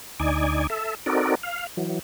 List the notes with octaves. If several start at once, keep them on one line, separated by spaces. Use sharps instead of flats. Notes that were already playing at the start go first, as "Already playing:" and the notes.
D2 D#4 D5 G#5
A4 E5
C4 D#4 F#4 A4 A#4 D5
F5
E3 F#3